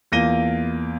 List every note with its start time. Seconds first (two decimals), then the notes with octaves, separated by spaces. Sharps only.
0.12 E2 A#3 F4 A#6 D#7 G7